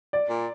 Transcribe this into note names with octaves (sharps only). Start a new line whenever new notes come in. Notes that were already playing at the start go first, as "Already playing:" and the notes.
D5
A#2